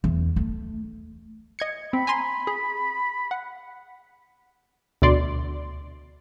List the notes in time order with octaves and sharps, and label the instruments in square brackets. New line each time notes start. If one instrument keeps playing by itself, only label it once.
[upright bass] E2
A3
[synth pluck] D#5 G#6 C#7
[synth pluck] C4 [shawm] B5
[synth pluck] G#5 A#5 C6
G#4
F#5
[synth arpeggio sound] D2 B2 D5 C6